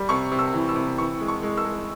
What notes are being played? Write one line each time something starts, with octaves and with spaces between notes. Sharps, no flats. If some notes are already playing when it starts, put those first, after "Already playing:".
Already playing: G3
C3 C#6
C3
E6
E3
E6
C3
E3 C#6
G#3
C#6
G#3
E6
G#3